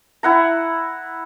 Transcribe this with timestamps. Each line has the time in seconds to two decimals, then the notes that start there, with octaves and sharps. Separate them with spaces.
0.23 E4 F#5 A#5